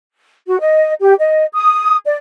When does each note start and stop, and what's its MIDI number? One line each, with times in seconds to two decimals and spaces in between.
0.47 0.56 66
0.60 0.92 75
1.00 1.14 67
1.20 1.46 75
1.54 1.96 87
2.06 2.17 74